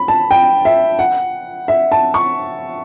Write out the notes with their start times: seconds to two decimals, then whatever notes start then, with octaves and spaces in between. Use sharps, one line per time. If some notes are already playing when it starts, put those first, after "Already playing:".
Already playing: B5
0.08 A5
0.31 G5
0.65 E5
0.99 F#5
1.68 E5
1.92 A5
2.14 C#6